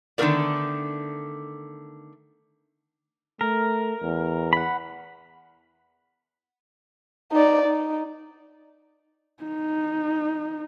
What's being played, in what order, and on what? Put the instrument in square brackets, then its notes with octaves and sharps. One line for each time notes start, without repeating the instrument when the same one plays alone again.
[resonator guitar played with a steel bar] D3 D#3 A3 B3 A#4 D5
[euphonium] A3 [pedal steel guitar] A#4
[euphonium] E2
[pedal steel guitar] F#5 B5
[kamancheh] D#4 D5
D#4
[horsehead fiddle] D#4